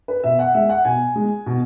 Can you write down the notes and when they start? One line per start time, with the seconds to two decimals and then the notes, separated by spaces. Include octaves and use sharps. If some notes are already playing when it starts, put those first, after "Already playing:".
0.08 B4
0.24 B2 E5
0.39 F#5
0.54 G#3 E5
0.69 F#5
0.85 B2 G#5
1.16 G#3
1.46 B2